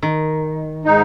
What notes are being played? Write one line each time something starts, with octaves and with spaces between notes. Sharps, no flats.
D#3
G#2 D#4